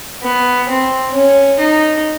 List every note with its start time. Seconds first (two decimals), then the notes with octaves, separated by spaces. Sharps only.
0.23 B3
0.68 C4
1.13 C#4
1.59 D#4